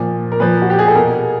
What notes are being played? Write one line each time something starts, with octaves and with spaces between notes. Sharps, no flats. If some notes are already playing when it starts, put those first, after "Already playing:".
Already playing: A#2 F3
A#4
A#2 F3 B4
F#4
G4
G#4
A4
B2 A#4